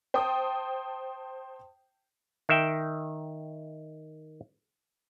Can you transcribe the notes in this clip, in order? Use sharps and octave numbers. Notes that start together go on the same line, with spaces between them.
C5 G5 A5 D#6
D#3 E5 G5